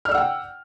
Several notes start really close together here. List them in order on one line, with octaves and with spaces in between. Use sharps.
F6 D5 E6 F#5 G5